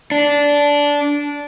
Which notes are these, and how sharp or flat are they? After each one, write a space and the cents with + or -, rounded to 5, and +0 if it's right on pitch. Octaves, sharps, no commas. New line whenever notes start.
D4 -15